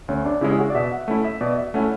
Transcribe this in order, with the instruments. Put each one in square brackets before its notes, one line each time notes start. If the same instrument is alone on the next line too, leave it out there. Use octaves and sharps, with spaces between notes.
[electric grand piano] D2 [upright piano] C#4
[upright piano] D4
[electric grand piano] C#3 G#3 C#4 [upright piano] E4
[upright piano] G#4
F#4
D5
[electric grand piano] B2 [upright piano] E5
[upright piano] F#5
[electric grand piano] A3 C#4 E4
[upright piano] E5
[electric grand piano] B2 [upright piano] D5
[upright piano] E5
[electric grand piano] A3 C#4 E4 [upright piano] F#5